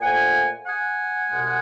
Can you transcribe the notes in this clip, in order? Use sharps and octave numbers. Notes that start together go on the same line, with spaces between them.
A#2 F3 A3 F#5 G#5
F#5 G#5
C2 B2 G#3